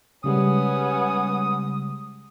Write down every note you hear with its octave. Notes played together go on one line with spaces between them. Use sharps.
C#3 G3 G#3 B3 C#4 D#6